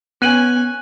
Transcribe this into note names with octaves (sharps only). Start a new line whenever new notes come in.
B3 C#4 G#5 F#6 D#7 F#7